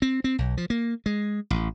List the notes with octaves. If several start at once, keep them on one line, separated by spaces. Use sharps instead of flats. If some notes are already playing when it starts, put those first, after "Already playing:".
C4
C4
B1
F3
A#3
G#3
A1